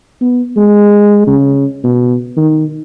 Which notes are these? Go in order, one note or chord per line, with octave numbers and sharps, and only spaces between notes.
B3
G#3
C#3
B2
D#3